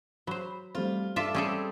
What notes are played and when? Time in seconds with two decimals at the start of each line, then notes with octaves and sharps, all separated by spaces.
0.27 F#3 C5 B5
0.75 G3 A3 C4 F4
1.16 G2 F4 A4 D5 E5
1.34 G3 C4 C#4 G#4 A4 D#6 E6 G#6